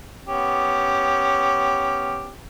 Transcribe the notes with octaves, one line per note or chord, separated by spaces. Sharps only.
B3 C#4 G4